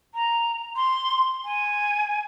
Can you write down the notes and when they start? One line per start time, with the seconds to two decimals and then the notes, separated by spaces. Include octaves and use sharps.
0.14 A#5
0.76 C6
1.45 G#5